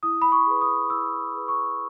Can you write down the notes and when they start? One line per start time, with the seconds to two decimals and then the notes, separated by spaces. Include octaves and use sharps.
0.03 E4 D#6
0.22 B5
0.32 C#6
0.47 G#4 B4
0.61 D#6
0.90 E4 E6
1.34 G#4 B4
1.48 C#6